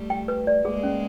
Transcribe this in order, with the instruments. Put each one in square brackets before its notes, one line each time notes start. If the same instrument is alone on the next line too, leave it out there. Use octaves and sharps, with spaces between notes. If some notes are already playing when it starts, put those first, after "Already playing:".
Already playing: [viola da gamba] G3 A3
[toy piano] G5
B4
D5
[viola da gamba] G#3 A#3 [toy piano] G#4
[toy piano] C#4